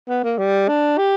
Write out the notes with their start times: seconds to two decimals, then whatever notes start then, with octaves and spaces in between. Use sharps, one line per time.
0.08 B3
0.23 A#3
0.38 G3
0.68 D4
0.98 G4